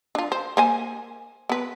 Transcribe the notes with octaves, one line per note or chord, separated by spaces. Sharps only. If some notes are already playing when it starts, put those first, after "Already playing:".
D4 F4
C5
A#3 C5 G#5
B3 B4